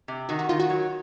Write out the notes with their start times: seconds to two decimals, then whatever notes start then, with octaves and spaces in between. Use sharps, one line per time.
0.08 C3
0.29 D#3 F#4
0.39 F#4
0.49 D#3 F4
0.59 F#4
0.70 F#3